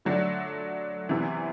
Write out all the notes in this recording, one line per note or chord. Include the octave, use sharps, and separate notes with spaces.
D3 F#3 A3 D4
E2 C3 E3